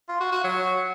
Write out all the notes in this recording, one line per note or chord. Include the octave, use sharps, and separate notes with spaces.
F4
F#4
F#4
F#3